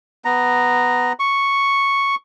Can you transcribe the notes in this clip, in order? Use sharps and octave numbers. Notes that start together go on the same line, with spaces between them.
B3 A#5
C#6